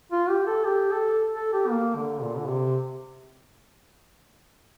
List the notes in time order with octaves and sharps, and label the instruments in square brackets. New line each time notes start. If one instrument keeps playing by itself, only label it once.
[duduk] F4
G4
A4
G4
A4
A4
G4
A#3
D3
A#2
D3
C3